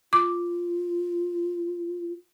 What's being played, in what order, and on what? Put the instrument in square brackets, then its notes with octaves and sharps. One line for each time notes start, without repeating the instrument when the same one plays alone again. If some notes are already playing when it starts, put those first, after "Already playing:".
[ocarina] F4 [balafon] D6